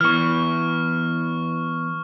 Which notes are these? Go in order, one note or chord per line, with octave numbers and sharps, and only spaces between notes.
E3 B3 C#6 F6